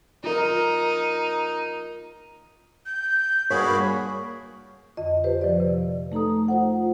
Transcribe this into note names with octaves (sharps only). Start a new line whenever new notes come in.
D#4 F4 A#4
G6
G2 A#3 F#4 G#4 C#5 B5
F2 D3 D#5
G4 B4 C5
F3 D5
C3
A3 D#4 A4 A#5 D#6
F4 C5 F#5